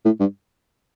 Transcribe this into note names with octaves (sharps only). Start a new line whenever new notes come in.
A2
G2